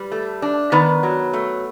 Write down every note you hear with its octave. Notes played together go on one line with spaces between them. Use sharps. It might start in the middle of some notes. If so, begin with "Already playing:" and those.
Already playing: G3 B4
A3
D4
D#3 B3 B4
F#3
A3